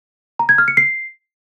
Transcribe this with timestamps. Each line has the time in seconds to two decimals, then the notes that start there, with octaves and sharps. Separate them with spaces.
0.39 A#5
0.49 G#6
0.58 F6
0.68 C#7
0.77 C7